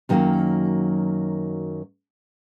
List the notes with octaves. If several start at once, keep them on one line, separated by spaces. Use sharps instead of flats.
F#2 D#3 F#3 G3 A#3